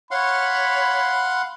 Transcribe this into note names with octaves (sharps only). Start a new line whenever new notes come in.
C#5 F5 F#5 B5 C6